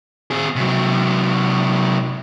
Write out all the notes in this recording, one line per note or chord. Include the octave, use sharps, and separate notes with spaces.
C4 G#4
C3 F#3